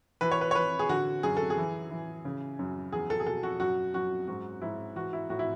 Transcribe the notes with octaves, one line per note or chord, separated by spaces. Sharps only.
E3 B4
C#5
B4
C#5
E3 B4
G#4
D3 F#4
F#2 G#4
A4
G#4
E3
E3
C#3
F#2
E2 G#4
A4
G#4
B2 A4
F#4
F#2 F#4
F#2 F#4
G#2 F#4
G#2 E4
E3 F#4
E4
A2 F#4
E4